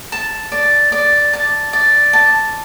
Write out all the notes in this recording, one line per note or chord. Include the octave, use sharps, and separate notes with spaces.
A5
D5
D5
A5
D5
A5